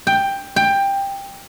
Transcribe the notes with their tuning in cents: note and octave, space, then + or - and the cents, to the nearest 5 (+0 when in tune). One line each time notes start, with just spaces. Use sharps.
G5 +10
G5 +15